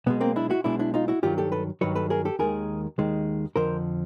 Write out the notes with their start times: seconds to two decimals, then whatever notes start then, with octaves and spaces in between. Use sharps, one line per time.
0.06 B1 B2 G#3 B3
0.21 A#3 C4
0.36 D4 E4
0.50 E4 F#4
0.64 B1 B2 G#3 D4 E4
0.79 D4 E4
0.94 D#4 F4
1.08 E4 F#4
1.22 G2 D#3 F#3 F4 G4
1.38 G4 A4
1.52 A4 B4
1.81 G2 D#3 F#3 B4 C#5
1.95 A4 B4
2.10 G#4 A#4
2.25 G4 A4
2.39 D#2 D#3 G#3 G#4 A#4
2.98 D#2 D#3 G#3
3.56 F2 D3 F3 A#4 C5